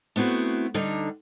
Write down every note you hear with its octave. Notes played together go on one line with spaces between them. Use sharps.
A3 B3 C4 E4 F#4
D2 D3 G3 D#4